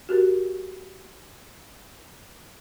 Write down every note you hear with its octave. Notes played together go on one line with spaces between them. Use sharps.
F#4 G4 A#4